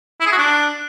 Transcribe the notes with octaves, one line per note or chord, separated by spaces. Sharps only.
E4
G#4
F#4
D4